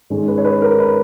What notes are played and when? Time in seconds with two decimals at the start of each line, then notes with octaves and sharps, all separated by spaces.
0.10 G#2 D#3 G#3 C#4
0.28 B4
0.38 C#5
0.44 B4
0.62 A#4
0.80 B4